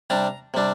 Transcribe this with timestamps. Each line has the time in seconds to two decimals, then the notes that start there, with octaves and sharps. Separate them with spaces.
0.10 C3 G3 D4 A#5
0.54 C3 G3 D4